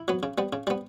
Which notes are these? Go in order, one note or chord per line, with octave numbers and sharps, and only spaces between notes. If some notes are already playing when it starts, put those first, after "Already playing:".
Already playing: E4
F#3 B3
C#3
G3 B3
C#3
G3 B3